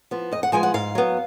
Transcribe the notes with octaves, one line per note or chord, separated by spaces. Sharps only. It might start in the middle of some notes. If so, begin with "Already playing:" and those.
F3 B3
F2 D#5
F#5
F3 G#3 B3 G#5
F#5
G#2 F5
F#3 B3